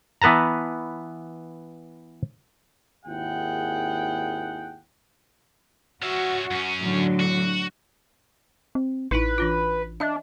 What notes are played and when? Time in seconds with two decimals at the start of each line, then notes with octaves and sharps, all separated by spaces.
0.22 E3 B3 B4 A5 A#5
3.05 G#1 D#2 E4 G#4 F#5 G5
6.02 C#4 F#4 E5
6.51 F#2 C#4
6.80 A2 D3 F#3
7.20 F#4
8.75 C4
9.11 A1 D#4 E4 B4
9.38 E3 D4 F4
10.00 D4 D#5 E5